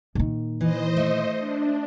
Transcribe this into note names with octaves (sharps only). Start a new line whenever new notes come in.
A#2 D#3
E3 C5 D#5
A3
D4